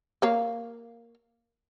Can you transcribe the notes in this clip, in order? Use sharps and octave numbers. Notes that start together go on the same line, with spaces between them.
A#3 C#5 F5